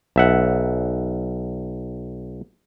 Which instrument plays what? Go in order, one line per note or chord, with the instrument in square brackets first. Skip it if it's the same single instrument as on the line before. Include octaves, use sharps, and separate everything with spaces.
[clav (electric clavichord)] B1 E5 F#5